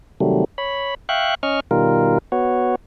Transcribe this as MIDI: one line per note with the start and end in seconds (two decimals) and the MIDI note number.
0.20 0.44 48
0.20 0.44 51
0.20 0.44 54
0.20 0.44 55
0.20 0.44 57
0.58 0.94 73
0.58 0.94 83
1.09 1.35 76
1.09 1.35 77
1.09 1.35 79
1.09 1.35 85
1.09 1.35 90
1.43 1.60 61
1.43 1.60 75
1.43 1.60 85
1.43 1.60 89
1.71 2.18 47
1.71 2.18 51
1.71 2.18 55
1.71 2.18 65
1.71 2.18 70
2.32 2.75 59
2.32 2.75 66
2.32 2.75 73